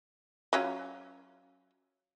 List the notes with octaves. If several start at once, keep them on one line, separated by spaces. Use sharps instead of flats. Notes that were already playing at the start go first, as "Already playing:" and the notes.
F#3 C#4 F4